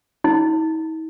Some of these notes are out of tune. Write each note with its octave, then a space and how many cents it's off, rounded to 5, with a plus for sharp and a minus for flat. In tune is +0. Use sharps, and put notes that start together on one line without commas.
D#4 +45